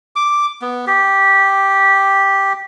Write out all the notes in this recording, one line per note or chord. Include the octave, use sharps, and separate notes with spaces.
D6
B3
G4